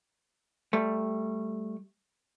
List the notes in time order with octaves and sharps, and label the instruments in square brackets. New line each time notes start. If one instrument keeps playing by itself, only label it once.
[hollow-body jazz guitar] G3 A3